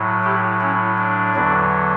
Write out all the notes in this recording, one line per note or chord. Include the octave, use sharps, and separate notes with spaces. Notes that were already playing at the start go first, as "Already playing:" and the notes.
Already playing: A2 F#3
E4 G4
C#4 E4
D4
E2 D3 F#3